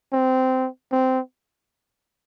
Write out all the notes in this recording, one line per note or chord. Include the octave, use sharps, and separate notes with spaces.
C4
C4